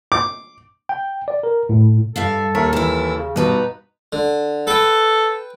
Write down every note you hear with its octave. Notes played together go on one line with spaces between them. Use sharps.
D6
G5
D5
A#4
A2
G2 A4 E5 F5
D#2 A#4 C#5 E5
E3 E4 A4
C#3
G2 B2 B3 D#4 B4 A#5
D3
A4 B4 G5